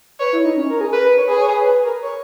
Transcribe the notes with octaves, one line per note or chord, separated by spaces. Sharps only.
B4 C#5
E4
D#4
C#4
A#4
G#4
A#4 B4
B4
C#5
G#4 B4
C#5
B4
B4
A#4
C#5